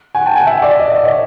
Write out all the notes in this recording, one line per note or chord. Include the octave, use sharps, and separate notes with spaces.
F#5 G#5
G5 A5
F#5 G#5
E5 F#5
D5 E5
D#5
E5
C#5 D#5